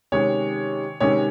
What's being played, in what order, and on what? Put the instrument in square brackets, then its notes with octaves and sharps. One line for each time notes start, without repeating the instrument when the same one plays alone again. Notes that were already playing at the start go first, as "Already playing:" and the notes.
[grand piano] C3 D#3 G#3 C#4 C#5
C3 D#3 G#3 C#4 C#5